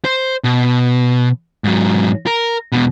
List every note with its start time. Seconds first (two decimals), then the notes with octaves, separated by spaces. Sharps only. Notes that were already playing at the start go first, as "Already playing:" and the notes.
0.05 C5
0.44 B2
1.64 G#2 F#3
2.27 A#4
2.72 E2 B2